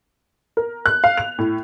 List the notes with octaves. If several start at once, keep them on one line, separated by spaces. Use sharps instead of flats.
A#4
F#6
F5
F7
A2